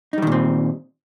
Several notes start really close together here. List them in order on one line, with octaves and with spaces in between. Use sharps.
D#4 G3 D#3 A#2 C4